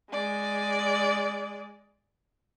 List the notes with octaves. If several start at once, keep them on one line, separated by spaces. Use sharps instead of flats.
G#3 D5